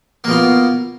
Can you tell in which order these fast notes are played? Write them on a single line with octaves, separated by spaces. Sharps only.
A#3 B2 F4